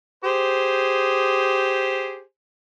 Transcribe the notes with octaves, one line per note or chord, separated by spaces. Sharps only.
G4 G#4 C5